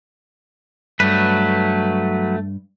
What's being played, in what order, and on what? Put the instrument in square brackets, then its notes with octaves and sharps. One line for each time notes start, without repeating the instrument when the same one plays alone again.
[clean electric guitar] G2 [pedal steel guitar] F#3 B4 [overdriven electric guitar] A3